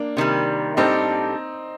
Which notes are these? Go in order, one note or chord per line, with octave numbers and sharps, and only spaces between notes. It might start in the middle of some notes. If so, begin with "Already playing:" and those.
Already playing: A#3 D4
C3 D#3 G3
A2 G3 C4 D4 D#4 A4